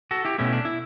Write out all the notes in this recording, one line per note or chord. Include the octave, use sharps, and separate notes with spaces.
F#4 A4
E4 G4
B2 A3 C#4 E4
D4
E4